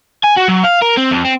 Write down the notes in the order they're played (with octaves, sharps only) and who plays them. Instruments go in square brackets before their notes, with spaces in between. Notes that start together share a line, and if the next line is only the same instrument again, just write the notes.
[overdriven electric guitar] G#5
F#4
F#3
F5
A#4
C4
F2
C4